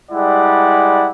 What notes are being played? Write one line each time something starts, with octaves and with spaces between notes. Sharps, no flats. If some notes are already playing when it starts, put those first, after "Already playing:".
G3 G#3 E4 D5 F#5